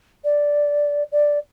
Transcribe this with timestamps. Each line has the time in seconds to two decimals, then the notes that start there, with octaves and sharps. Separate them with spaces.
0.24 D5
1.12 D5